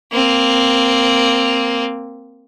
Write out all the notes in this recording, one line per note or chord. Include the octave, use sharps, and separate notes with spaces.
A#3 C4